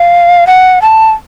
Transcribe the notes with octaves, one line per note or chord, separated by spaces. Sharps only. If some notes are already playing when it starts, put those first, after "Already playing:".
Already playing: F5
F#5
A5